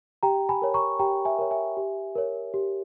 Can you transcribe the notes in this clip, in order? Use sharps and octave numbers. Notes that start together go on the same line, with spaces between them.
G4 G5 A#5
G#5 B5
A#4 C#5
A#5 C#6
G4 G5 A#5
E5 G#5
A#4 C#5
E5 G#5
G4
A#4 C#5
G4